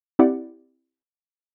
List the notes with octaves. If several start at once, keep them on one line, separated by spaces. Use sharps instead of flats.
C4 E4 G4 D5 F#5